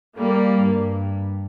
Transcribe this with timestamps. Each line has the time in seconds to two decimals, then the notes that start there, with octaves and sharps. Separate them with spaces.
0.16 G3 A#3
0.62 G2